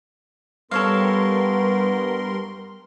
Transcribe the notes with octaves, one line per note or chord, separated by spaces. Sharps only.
G2 G3 B3 A4 A#4 C#5 F5 C6